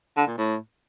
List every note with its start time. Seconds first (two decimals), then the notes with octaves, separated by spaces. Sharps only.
0.17 D3
0.27 A#2
0.37 A2